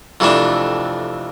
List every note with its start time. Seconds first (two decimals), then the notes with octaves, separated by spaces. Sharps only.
0.20 F2 C3 E3 A3 D4